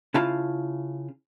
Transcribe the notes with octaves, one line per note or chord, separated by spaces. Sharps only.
C#3 E4 F4 A5